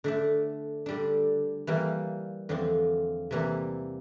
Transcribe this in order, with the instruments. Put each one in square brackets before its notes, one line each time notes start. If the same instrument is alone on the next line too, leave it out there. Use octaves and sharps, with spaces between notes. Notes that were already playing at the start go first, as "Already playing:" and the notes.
[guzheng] D3 A3 D4
D3 G3 D4
E3 G3 A#3 F4
E2 D3 F3 C4 F4
C3 E3 G3 A#3